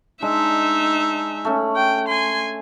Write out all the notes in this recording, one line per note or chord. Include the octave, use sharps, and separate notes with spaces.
G#3 D4 D#4 E5
A3 C#4
G5
G#5 C6